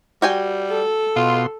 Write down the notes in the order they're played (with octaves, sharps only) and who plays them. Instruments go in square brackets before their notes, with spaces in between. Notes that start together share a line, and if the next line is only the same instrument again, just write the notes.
[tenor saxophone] G3 [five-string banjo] F#4 G5 G#5
[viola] A4
[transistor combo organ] B2 C6 [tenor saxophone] F4